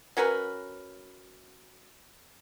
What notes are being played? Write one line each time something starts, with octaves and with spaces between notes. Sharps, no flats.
F#3 C#4 A#4 B4